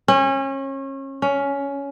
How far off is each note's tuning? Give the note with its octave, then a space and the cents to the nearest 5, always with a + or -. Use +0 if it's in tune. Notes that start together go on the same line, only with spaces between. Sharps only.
C#4 -30
C#4 +15